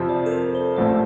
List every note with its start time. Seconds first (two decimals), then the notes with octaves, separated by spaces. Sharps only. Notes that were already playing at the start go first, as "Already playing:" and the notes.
Already playing: F2 C3 F3 C4
0.09 D5
0.26 A4
0.31 A#4
0.55 C5
0.76 A1 A2 F3 A3 C4 D5